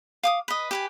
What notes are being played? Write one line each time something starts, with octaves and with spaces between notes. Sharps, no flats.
F5 D6 D#6
B4 D#5
G4 B4 G#5